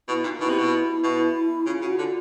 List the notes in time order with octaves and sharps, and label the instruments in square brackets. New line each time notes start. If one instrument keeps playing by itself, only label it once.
[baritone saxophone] B2 [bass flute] E4
[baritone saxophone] A#2 [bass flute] D#4
[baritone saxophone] B2 [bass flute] E4
[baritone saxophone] C3
B2
B2
[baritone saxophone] C#3 [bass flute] F4
[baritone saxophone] C#3 [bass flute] F#4
[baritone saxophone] D3 [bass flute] F4